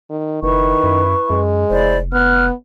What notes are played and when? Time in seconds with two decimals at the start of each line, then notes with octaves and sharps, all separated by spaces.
0.10 D#3
0.43 F#1 D#3 E4 B4 C#6
0.84 F#2
1.30 F#2 G#3
1.71 F1 E4 C5 D5
2.13 B3 F6 F#6